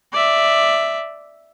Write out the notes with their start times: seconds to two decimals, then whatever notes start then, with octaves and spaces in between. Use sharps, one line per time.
0.12 D5 E5